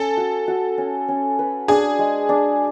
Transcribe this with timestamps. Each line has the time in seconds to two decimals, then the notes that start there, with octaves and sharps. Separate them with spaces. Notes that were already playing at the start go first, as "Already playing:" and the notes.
Already playing: C#4 A4
0.17 F#4
0.48 F#4
0.78 C#4
1.08 C#4
1.39 B4
1.68 D4 G#4
1.99 G#3
2.29 D4